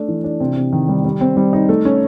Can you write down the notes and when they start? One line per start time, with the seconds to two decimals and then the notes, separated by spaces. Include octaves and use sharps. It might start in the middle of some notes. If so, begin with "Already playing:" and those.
Already playing: A3 D4
0.08 E3
0.24 D4
0.40 C3
0.56 C3
0.72 D#3
0.88 G3
1.05 G3
1.21 C4
1.37 G3
1.53 D#4
1.69 A3
1.85 C#4